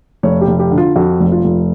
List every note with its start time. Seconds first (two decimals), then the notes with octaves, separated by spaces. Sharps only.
0.23 F1 C#5
0.41 G4
0.48 F1
0.59 G4
0.71 D3
0.78 F4
0.96 F2 F#4
1.20 F1
1.32 F4
1.44 F1